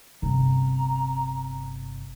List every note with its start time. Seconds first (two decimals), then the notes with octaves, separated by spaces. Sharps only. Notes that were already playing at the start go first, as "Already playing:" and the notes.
0.22 G1 C3 A#5